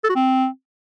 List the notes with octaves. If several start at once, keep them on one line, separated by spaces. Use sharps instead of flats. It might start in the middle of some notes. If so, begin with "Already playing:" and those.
A4
F#4
C4